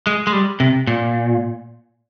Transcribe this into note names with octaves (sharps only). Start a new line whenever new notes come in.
G#3
G#3
G3
C3
A#2